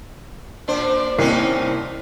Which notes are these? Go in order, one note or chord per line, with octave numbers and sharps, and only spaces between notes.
A#2 D4 C5
C2 A#3 C4 C#4 D#4 C7